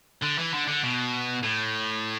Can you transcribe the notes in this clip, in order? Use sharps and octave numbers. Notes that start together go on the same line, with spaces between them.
D3
E3
D3
D3
B2
A2